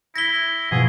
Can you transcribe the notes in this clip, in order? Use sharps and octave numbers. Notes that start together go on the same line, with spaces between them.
E4 A#6 B6 G7
B2 F3 G#4